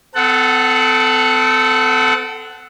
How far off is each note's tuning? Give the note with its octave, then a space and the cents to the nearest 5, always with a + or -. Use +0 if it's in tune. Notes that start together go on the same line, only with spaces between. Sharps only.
C4 -40 A4 +0 F#5 +0